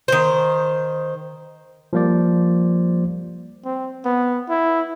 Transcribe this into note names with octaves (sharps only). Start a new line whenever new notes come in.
D#3 C5
F3 G3 A#3 C5 D5
C4
B3
E4